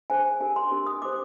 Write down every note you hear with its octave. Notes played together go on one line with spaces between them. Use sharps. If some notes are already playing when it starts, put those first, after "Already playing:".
D4 G#4 C5 G#5
D4 G4 A#4 G#5
C6
D4 G4 A#4
D#6
D4 G4 C5 D6